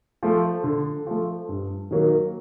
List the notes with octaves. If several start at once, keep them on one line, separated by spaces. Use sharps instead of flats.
F3 A3
D3
F3 A3
G2
D#3 F#3 A#3